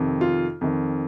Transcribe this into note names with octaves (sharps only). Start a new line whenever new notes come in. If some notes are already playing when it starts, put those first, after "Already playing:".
Already playing: F2 C3 D#3
F4
F2 D#3